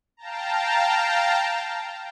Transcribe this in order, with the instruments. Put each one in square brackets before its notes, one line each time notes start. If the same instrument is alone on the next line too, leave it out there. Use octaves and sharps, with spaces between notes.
[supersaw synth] F5 G5 A5 A#5